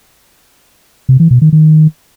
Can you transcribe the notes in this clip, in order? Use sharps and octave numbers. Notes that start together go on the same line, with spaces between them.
C3
E3
B2
D#3
D#3